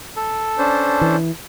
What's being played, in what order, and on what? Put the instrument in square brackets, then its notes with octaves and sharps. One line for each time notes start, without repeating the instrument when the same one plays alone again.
[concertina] A4
[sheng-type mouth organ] C#4 D4 C5
[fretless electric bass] E3